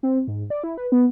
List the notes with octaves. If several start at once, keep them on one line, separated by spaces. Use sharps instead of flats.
C4
G#2
D5
E4
B4
B3